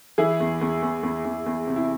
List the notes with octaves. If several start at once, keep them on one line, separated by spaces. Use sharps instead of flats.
E3 E4 G#4
E2
E2
E2
E2
E2
E2
C3
E4